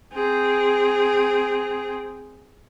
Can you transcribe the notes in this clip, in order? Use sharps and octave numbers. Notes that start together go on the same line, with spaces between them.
C4 G#4